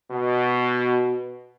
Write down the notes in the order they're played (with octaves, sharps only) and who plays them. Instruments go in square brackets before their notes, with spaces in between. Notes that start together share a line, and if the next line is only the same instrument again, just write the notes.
[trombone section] B2